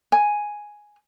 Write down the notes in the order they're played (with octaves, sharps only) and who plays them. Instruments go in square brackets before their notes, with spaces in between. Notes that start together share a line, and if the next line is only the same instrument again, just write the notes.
[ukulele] G#5